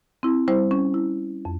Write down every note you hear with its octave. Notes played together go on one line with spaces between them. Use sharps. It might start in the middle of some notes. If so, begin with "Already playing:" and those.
C4 E4
G3 E4 C5
C#4
E4
F2